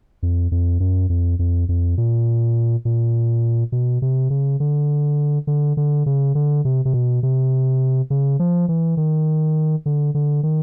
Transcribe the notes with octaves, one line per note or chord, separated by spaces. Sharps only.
F2
F2
F#2
F2
F2
F2
A#2
A#2
B2
C3
C#3
D3
D3
D3
C#3
D3
C3
C3
B2
C3
C#3
F3
E3
D#3
D3
D3
D#3